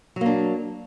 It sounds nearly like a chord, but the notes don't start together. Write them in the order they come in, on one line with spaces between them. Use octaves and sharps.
F#3 A#3 D4